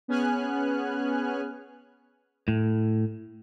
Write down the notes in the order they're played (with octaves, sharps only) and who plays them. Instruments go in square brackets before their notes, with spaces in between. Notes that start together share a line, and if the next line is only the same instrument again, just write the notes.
[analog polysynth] B3 C#4 G#4 G#5 F6 F#6
[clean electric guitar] A2